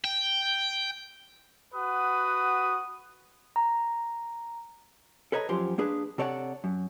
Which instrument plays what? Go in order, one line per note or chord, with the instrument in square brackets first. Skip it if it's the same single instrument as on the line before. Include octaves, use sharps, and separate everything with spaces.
[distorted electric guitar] G5
[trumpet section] F#4 B4 F#5 D#6
[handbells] A#5
[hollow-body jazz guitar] A4 B4 C#5 D#5 A#5
F#2 F3 G4 C5 C6
A#3 D4 G#4 B4
C3 A4 C#5 D5 E5 F#5
F#2